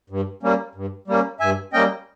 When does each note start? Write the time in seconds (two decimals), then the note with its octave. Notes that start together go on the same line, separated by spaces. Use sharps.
0.10 G2
0.43 G3 A#3 C#4
0.75 G2
1.08 G3 A#3 C#4
1.40 G2 E5 G#5
1.73 G3 A#3 C#4 D#5 G5